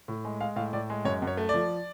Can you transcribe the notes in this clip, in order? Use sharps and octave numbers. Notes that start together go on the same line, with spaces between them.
A2
G#3
G#3 F5
A2 F5
A2 D5
G#3
F#2 C#5
F#2
C#5
A3
F3 D5